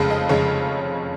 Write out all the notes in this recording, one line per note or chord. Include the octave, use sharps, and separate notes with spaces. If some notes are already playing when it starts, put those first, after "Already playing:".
Already playing: F1 F2 C#3 G#3 F5
D#5
F1 F2 C#3 G#3 C#5